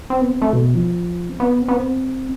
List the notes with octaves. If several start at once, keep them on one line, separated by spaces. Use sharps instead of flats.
C4
B3
C4
A3
B2
F3
C4
B3
C4
B3
C4